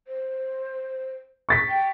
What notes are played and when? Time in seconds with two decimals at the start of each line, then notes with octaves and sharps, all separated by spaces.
0.08 C5
1.49 C#6 A6 B6
1.69 G5